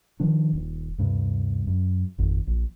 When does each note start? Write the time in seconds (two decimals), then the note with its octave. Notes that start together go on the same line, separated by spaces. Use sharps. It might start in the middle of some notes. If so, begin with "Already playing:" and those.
0.20 D#3 F3 D4
0.53 D#1
0.98 D2 G2 C3
1.67 F#2
2.18 G#1 F2
2.47 A#1